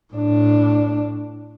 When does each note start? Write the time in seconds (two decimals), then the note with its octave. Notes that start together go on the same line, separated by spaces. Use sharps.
0.14 A2 D4